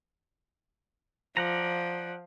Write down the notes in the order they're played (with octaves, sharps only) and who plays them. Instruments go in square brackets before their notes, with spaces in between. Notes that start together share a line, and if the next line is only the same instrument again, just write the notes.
[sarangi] F3 [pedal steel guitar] D5 F#5 A#5